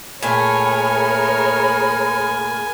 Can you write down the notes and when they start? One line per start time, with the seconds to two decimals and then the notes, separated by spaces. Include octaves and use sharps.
0.23 A#2 A3 G#4 A#4 C#5 G#5 B5